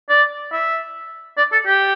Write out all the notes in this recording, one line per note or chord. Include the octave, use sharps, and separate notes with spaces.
D5
E5
D5
A4
G4